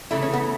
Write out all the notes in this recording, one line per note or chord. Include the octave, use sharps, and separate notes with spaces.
C#3 E3 A3 E4
C#4
B3